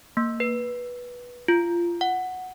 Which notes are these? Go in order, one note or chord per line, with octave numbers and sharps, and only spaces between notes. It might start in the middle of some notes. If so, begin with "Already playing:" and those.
A#3
B4
F4
F#5